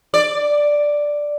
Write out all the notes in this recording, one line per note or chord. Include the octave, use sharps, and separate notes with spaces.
D5